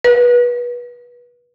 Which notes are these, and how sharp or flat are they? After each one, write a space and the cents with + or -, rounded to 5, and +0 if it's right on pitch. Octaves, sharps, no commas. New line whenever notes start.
B4 -30